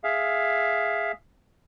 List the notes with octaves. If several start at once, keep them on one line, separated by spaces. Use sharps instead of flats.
G#4 E5 F5